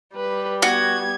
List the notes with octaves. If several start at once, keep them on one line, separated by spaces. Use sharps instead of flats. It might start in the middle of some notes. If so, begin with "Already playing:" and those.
G3 B4
B3 F#4 G#6